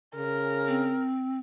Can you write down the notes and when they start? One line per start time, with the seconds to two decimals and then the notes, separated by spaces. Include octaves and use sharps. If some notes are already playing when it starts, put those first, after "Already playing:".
0.15 C#3 A#4
0.68 C4